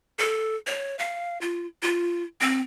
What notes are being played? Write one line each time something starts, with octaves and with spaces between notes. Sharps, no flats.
A4
C#5
F5
F4
F4
C4